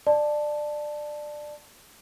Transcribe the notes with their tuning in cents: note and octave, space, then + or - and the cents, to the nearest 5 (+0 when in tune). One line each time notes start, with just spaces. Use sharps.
D5 +20 A5 +0